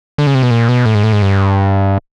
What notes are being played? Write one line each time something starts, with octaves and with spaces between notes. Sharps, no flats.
D3
C#3
C3
B2
A#2
B2
A2
G#2
A2
G#2
G2